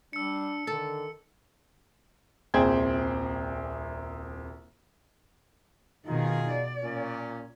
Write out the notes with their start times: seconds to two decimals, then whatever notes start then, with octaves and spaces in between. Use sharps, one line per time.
0.13 G3 D4 E6 C#7
0.67 D3 D#3 A4
2.54 D#1 C2 G#4 C5 G5 G#6
6.06 B2 D#3 D#4 F4 G#4
6.50 D5
6.83 A#2 C#4